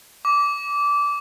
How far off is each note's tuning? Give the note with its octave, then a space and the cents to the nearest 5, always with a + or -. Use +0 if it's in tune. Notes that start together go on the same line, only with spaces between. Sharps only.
D6 -20